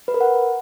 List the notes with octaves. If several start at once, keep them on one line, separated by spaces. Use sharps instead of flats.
B4
A#4
F#5